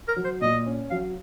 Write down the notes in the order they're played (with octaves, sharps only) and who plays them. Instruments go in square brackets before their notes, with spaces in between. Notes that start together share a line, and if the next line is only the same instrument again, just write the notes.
[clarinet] A#4
[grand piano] F#3
[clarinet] C5
[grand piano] A#2 [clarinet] D#5
[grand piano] C#4
[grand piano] F#3 [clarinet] F5